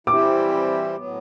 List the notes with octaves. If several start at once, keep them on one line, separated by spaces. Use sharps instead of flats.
E3 G3 C4 E4 G4 D6
A2 F#3 B3